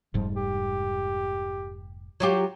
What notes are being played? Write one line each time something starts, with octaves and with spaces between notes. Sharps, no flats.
F1 G#2 F3 G3
G4
F#3 F4 G4